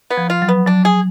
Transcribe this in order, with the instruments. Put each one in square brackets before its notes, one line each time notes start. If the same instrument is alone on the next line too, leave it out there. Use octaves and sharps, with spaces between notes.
[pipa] B3
[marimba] F3
[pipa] F4
[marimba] F#3
[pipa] B3
[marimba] F#3 [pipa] D4
[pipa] G#4